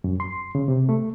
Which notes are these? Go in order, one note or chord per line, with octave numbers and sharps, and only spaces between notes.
F#2
C6
C#3
C3
A3